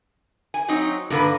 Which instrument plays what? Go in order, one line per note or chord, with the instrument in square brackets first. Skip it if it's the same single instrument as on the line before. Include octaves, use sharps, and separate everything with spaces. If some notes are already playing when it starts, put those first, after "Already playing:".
[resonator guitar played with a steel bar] G#5
F#3 C4 D#4
[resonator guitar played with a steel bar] G2 A#3 B4 [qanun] D3 A#4